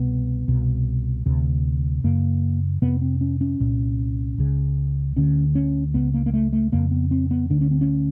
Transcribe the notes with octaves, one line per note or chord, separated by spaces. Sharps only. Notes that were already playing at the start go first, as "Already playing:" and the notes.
Already playing: C2 B2 B3
C2 B2
D2 C3
F#2 C#3 A#3
F2 C3 B3
C4
C#4
C#4
C2 A#2
C#2 C#3
D2 D3 C#4
C#4
C#2 C#3 B3
A#3
A#3
A3
A3
F2 C#3 A#3
B3
C4
B3
D2 D3 D4
C#4
C4
C#4